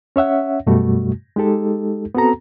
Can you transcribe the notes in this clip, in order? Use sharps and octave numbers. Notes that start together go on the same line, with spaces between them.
C#4 C#5 E5 F#5
F#2 B2 G3 A3 F#4
G#3 D#4 G4 A4
B3 C4 F#4 A4 A#5